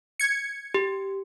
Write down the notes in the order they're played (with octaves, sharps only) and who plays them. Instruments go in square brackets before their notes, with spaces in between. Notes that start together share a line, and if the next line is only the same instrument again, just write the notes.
[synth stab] G#6 C#7
[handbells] G4